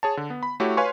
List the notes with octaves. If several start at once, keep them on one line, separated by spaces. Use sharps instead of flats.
G#4 C#5 A5
D3
B3
B5
A3 E4 F#4 G4 C#5
B4 C#5 F5 G#5 C6 C#6